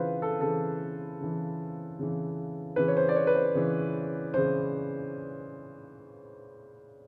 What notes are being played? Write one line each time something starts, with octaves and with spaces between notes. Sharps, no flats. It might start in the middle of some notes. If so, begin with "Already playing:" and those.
Already playing: C#3 E3 F4 B4 C5
A4
C#3 E3 A4
C#3 E3
C#3 E3
C#3 E3 B4
C#5
C5
D5
C#5
B4
C5
C#3 E3
C#3 E3 C5